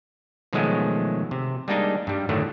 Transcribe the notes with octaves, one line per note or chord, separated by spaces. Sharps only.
B2 D#3 F3 F#3 G#3 A3
C3
G3 G#3 A#3 D4 D#4
G2 G3
A2 D3 D#3 F#3 A3